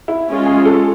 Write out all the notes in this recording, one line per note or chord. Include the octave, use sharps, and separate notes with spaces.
E4
G#3 C#4 F4
G#4
A4